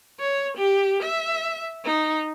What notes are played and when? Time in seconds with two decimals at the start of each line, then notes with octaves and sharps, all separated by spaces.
0.20 C#5
0.57 G4
1.03 E5
1.85 D#4